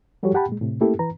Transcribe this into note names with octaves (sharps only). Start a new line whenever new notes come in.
F3 G3 F#4 G4 A4 C#5
G4 F#5 G5 A5 B5
A#2 G#3
A2 C3
A3 A#3 C#4 E4 G4 A4
E3 B4 A#5